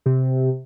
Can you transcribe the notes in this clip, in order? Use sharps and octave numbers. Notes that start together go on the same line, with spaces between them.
C3